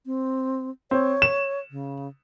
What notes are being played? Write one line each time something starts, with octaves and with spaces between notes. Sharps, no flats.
C4
C4 C#5
E7
C#3